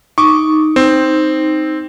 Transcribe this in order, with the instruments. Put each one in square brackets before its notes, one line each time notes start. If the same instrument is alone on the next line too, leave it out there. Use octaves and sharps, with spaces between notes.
[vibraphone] D#4 [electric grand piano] C#6 D6
[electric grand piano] C4